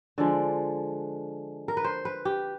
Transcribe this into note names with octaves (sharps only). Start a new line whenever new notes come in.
D3 F3 G#3 D5
A#4
B4
C5
B4
G4